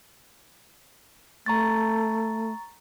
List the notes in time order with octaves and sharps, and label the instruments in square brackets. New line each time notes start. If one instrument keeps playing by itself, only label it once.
[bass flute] A3 [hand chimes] A#5 C#6 A6